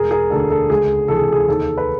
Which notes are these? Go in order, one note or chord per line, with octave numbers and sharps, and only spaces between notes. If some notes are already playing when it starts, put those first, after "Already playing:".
Already playing: E1 G#4 A#4
G#4 A#4
D2 D3 A4
A4
C#2 G#4
C3 E3 A4
G#4
G#4
D#2 A4
B4